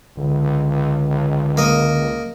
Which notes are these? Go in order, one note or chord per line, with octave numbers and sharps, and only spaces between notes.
C#2 D3
A#3 D#5